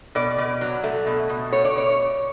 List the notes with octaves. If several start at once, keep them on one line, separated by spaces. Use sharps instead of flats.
B2 D5
B2
F#3
A3
B2
B2
A3 C#5
D5
B2 C#5